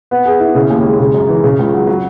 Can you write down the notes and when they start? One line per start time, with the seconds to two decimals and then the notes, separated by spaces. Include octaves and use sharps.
0.11 B3
0.25 G#4
0.40 E4
0.55 C#3
0.70 D#2
0.84 G#3
0.99 C#3
1.14 F#2
1.29 E3
1.44 C#3
1.59 C#2
1.73 F#3
1.87 F#3